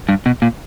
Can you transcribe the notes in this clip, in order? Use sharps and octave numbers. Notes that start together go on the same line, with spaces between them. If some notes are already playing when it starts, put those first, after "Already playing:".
G2
B2
A#2